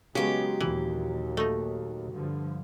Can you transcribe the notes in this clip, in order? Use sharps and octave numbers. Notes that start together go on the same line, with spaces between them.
C#3 F#3 G#3 B3 C#4 G4
D#2 A#2 E3
A3 D#4
G2 D3 F3